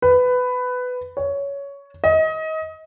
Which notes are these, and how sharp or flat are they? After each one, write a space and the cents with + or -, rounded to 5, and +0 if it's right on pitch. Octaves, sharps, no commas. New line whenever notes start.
B4 +15
C#5 +15
D#5 +30